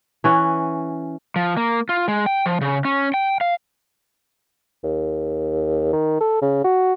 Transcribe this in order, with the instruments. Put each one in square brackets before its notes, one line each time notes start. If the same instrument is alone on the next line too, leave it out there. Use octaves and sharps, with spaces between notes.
[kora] E3 C#4 F#5
[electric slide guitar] F3
A#3
F4
G#3
G5
F3
C#3
C#4
G5
F5
[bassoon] D#2
D#3
A4
C#3
F#4